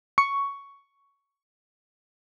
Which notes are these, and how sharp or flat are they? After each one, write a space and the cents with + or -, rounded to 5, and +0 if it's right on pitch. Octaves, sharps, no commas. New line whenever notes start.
C#6 +10